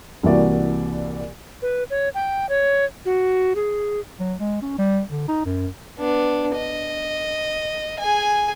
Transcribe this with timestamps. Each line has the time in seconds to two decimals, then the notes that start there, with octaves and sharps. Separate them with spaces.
0.23 C2 E3 A#3 F#4 D5
1.62 B4
1.90 C#5
2.15 G5
2.49 C#5
3.05 F#4
3.56 G#4
4.20 F#3
4.40 G#3
4.62 C#4
4.79 G3
5.11 D3
5.28 D#4
5.46 F#2
5.98 B3 D4
6.56 D#5
7.99 G#4 G#5